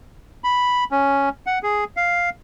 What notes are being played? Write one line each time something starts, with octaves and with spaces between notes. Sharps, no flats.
B5
C#4
F#5
G#4
F5